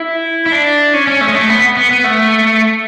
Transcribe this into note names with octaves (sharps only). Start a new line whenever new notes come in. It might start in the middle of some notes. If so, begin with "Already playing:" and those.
Already playing: E4
E4
D4
C#4
C#4
A3
G#3
A3
B3
B3
B3
A3